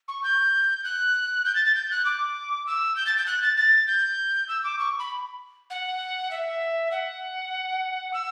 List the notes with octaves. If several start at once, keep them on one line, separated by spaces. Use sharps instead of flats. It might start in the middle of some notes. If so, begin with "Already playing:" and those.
C#6
G6
F#6
G6
A6
A6
G6
F#6
D6
E6
G6
A6
G6
F#6
A6
A6
G6
E6
D6
C#6
B5
F#5
E5
F#5
E6